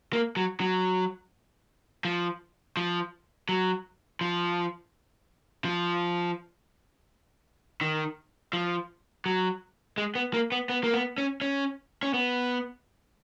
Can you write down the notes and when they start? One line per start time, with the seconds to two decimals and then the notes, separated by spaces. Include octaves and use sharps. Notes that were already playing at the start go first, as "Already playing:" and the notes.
0.13 A#3
0.37 F#3
0.60 F#3
2.05 F3
2.77 F3
3.49 F#3
4.21 F3
5.65 F3
7.81 D#3
8.53 F3
9.26 F#3
9.98 G#3
10.15 B3
10.34 A#3
10.52 B3
10.70 B3
10.84 A#3
10.94 B3
11.18 C#4
11.42 C#4
12.03 C#4
12.14 B3